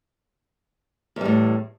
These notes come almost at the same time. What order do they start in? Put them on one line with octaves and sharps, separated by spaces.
E2 G3 A2